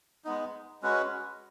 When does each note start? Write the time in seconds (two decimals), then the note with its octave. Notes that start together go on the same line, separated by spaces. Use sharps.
0.25 G#3 B3 D#4
0.82 G#3 C#4 F#4 B4